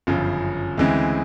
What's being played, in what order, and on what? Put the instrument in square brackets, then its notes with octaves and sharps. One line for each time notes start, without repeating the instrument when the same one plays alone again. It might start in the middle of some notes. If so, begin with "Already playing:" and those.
[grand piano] G1 F#2 C#3 F3
D2 C#3 E3 G#3 C4